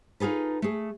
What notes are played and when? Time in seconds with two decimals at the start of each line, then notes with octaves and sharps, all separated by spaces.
0.20 D#4 F4 G#4 A4 B4
0.62 A3 G#4